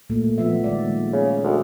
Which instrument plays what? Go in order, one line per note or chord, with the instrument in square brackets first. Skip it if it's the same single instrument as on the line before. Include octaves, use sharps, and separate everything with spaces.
[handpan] A#2 A3 A#3
F3 B3 E5
D#3 G#3 D5
[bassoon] C#3
D2